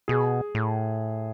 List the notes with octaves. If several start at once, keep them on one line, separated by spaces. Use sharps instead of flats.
B2 G#4
A2